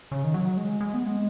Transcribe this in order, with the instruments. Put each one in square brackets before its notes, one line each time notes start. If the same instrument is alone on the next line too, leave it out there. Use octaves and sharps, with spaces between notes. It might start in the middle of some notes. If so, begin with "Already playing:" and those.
[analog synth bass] C#3
D#3
F#3
G#3
G#3
B3
G#3